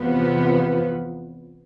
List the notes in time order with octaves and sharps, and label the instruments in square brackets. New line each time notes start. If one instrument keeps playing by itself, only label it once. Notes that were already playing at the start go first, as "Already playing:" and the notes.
Already playing: [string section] E2 C3 F3 B3